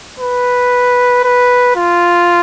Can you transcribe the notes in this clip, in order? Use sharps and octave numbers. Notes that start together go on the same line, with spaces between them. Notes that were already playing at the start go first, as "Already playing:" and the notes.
B4
B4
F4